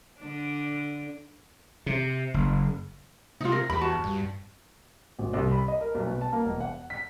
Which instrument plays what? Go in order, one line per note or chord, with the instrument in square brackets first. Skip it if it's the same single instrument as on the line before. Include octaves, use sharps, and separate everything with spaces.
[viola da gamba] D3 D4
[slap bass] C3
F#1
[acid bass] C3 [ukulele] D#4 F4
[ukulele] A#4
[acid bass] E2 [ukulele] B5
[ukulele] F#4 A5
[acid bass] G2
[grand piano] G#1
C2
B5
D#5
A#4
B1
B2
A5
A#3
E1
F#5
B6